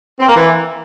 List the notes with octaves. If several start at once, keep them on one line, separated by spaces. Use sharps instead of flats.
C4
A#3
E3